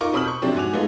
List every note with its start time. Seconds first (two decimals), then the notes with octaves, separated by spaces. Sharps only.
0.01 D#4 F4 A#4 C#6 D6
0.13 B2 C4 B5 D#6 F6 F#7
0.25 C#6 G6
0.42 C3 F3 F#3 C4 D4 G4
0.55 G#2 F#4 G#5 D6 F7
0.73 G#3 A3 B3 D#4 F4 G#4